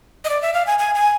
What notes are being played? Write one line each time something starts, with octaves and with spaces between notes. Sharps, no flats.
D#5
D5
E5
F5
G#5
G#5
G#5